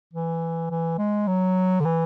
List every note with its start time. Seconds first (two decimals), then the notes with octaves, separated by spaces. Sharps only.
0.13 E3
0.70 E3
0.98 G#3
1.27 F#3
1.80 D3
1.85 E3